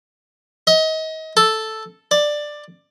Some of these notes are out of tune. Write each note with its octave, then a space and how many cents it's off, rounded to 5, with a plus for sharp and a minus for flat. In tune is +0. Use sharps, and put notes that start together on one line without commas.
D#5 +30
A4 +0
D5 +10